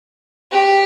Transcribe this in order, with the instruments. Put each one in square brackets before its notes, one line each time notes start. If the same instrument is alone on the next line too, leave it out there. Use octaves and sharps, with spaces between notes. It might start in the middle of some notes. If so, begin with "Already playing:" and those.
[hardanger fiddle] G4